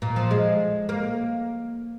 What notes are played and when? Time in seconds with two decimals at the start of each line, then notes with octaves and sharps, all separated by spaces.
0.02 A#2
0.16 F3
0.31 G#3
0.89 A#3